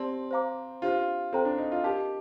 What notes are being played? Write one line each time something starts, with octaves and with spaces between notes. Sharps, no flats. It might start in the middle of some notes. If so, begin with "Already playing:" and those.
Already playing: C4 G4 D5 A5 C6
C5 F5 A#5 D6
D4 F4 G4 C5 F5
C4 A4 C5 G5 A#5
D4
D#4
F4
G4 A#4 D#5 A5